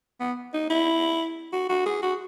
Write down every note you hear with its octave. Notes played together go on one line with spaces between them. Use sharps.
B3
D#4
E4
F#4
F#4
G#4
F#4